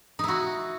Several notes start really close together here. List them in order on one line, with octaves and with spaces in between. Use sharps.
D#4 E4 F#4